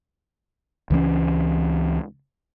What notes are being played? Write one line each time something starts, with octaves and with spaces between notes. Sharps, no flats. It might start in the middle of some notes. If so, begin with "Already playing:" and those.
C#2 E3 A3 C#4